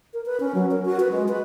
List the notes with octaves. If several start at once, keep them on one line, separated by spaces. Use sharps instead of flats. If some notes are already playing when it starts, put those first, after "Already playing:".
A#4
B4
C#4
F#3
A#4
F#4
B4
G#3
B4